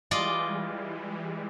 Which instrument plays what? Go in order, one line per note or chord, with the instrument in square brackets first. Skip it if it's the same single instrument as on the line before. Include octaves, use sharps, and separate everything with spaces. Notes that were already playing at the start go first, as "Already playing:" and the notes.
[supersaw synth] E3 G3 G#3 [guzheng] F4 D5 D#5